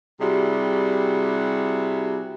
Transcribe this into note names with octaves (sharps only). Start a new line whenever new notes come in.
C3 G3 E4 F#4 G#4